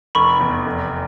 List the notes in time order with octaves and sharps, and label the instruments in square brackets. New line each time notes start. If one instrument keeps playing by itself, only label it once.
[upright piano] F1 [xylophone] B5 C#6
[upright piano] E2
F1